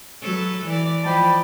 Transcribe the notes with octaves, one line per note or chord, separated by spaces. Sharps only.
F#3 A4 B4
E3 D5
F3 D5 D#5 G5 A5 B5